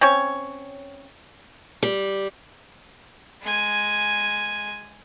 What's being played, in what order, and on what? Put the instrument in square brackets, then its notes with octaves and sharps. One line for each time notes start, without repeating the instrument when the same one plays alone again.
[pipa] C4 C#4 C#5
[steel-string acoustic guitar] G3
[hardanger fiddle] G#3 G#5